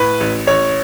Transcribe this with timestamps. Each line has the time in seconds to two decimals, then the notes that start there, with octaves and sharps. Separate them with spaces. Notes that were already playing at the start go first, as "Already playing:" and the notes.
Already playing: A2 B4
0.20 A1
0.47 A1 C#5